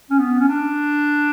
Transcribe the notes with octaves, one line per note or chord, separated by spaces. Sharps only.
C#4
B3
C#4
D4